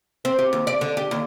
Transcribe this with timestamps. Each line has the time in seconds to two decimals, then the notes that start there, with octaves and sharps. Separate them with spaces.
0.25 C4
0.39 G4
0.53 D#2
0.67 D5
0.81 D3
0.97 G4
1.11 D#2